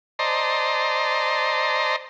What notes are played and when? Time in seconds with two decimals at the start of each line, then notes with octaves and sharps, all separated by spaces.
0.19 C5 D5 D#5 A5 A#5 C6